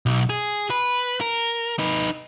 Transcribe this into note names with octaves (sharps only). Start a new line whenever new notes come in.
B1
G#4
B4
A#4
D#4 B4